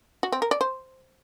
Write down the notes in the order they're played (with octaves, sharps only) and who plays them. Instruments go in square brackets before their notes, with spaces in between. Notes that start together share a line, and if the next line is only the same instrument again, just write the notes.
[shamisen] F#4
C4
A#4
D5
C5